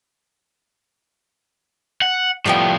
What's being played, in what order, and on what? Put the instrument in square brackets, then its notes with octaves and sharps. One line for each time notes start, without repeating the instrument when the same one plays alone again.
[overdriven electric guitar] F#5
[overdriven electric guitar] A2 F3 [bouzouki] G3 B3 G5